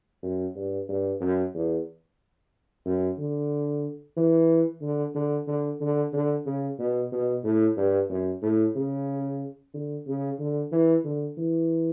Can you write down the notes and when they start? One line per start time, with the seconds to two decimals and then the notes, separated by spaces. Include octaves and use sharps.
0.22 F#2
0.56 G2
0.89 G2
1.21 F#2
1.54 E2
2.86 F#2
3.18 D3
4.17 E3
4.81 D3
5.15 D3
5.47 D3
5.80 D3
6.13 D3
6.46 C#3
6.79 B2
7.12 B2
7.44 A2
7.77 G2
8.09 F#2
8.42 A2
8.75 C#3
9.74 D3
10.07 C#3
10.39 D3
10.72 E3
11.04 D3
11.37 E3